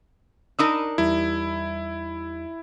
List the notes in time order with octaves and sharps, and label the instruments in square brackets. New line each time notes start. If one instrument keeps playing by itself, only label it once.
[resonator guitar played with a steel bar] D4 D#4 A#4 [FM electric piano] B5 D#6 E6
[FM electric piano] E2 G3 [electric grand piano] E4